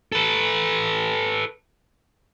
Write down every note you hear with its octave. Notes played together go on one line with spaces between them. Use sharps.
A4 B4